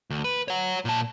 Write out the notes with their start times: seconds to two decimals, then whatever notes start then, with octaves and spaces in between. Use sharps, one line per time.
0.10 D2
0.24 B4
0.48 C#5 F#5
0.85 A#2 A5